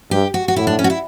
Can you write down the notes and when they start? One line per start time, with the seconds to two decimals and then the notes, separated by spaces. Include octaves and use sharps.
0.11 G2 G4
0.34 F#4
0.48 F#4
0.56 A2 E4
0.67 D4
0.79 C#4
0.84 F#4
0.90 E4